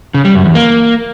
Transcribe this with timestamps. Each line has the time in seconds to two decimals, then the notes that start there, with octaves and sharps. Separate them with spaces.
0.14 C#3
0.25 G3
0.35 F#2
0.45 E2
0.55 A#3